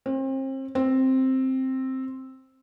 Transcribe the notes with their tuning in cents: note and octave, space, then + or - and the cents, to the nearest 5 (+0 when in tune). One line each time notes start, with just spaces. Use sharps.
C4 +35
C4 +5